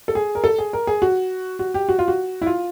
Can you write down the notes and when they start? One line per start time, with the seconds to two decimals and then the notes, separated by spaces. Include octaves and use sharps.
0.08 A4
0.15 G#4
0.35 A#4
0.44 A4
0.58 G#4
0.73 A#4
0.87 G#4
1.02 F#4
1.59 F#4
1.74 G4
1.89 F#4
1.99 F4
2.08 F#4
2.42 E4
2.46 F4